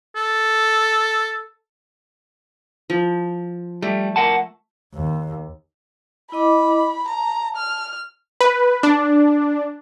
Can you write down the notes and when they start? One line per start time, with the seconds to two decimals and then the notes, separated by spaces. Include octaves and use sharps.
0.16 A4
2.90 F3
3.82 G3 A3
4.16 A#4 F#5 A5
4.95 D#2
6.32 E4 D#5 B5 D6
7.08 A5 A#5
7.56 F6
8.41 B4
8.83 D4